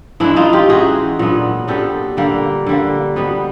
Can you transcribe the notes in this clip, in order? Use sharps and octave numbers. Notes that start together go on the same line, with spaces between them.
E3 G#3 C#4 D4 E4
D#4 F4
F4 G4
E3 G#3 C#4 F#4 G#4
A#2 F#3 B3 D4
A#2 F#3 B3 D4 G4 A4
D3 G3 A#3
D3 G3 A#3
B2 G3 B3